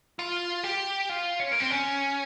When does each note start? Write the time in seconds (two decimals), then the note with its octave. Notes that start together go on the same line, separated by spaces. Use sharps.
0.19 F4
0.64 G4
1.09 F4
1.40 C#4
1.52 A#3
1.60 C4
1.71 C#4